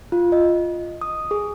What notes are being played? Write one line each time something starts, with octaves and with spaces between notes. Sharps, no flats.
F4
D#5
D#6
G#4